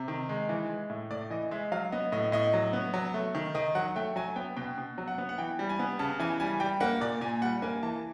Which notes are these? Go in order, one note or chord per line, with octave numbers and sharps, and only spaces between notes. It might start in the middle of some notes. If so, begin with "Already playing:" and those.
Already playing: C3
D#3
G#3
E3
G#3
A2
A2 D5
E3 D#5
G#3 E5
F#3 F5
B3 D#5
A2 D#5
A2 D#5
F#3
B3
F#3
A3
D#3
D#3 D#5
F#3 F#5
A3 G5
F#3 G#5
B3 G5
B2 G5
B2
F#3
F#5
B3
F#5
E3 G5
G3
G#5
B3
C#3 A5
E3 G#5
G3 G#5
G3 G5
A#3 F#5
A#2 D5
A#2 G#5
G3 F#5
A#3 G#5
E3 A5